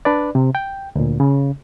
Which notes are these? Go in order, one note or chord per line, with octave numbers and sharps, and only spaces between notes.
D4 B4 D5
C3
G5
D2 A#2
C#3